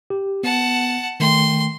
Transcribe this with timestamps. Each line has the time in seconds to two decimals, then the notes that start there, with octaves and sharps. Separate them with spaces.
0.10 G4
0.43 B3 F#5 A5
1.20 D#3 A3 G5 C6